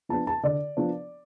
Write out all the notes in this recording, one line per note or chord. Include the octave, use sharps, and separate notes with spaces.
F3 B3 D4 A5
A5
D3 D5
F3 B3 D4